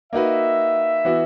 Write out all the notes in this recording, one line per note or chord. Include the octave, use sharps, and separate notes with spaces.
A#3 D#4 F#4 B4 E5
E3 B3 F#4